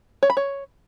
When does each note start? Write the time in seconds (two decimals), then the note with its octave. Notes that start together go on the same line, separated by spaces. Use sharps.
0.23 C#5
0.30 B5
0.37 C#5